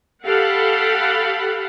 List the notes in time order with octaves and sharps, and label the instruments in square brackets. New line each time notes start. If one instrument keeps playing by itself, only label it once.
[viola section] G4 A4 F5 F#5 B5